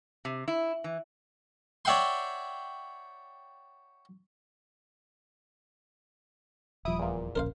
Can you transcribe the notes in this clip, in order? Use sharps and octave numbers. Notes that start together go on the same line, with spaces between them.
C3
E4
E3
C#5 D5 E5 F#5 G5 C6
D#1 F3 G3 E4 D#6 D7
E2 A#2
D1 A#1 C#4 A#4 C5 F5